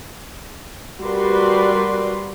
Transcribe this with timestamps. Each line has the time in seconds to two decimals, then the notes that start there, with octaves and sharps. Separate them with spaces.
1.02 G3 F#4 A#4 B4 D5 C6